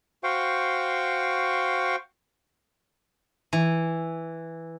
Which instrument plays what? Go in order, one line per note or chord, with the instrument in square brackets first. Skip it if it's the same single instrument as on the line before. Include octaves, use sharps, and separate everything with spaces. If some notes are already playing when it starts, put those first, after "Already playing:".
[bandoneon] F#4 C5 F5 G5 C#6
[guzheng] E3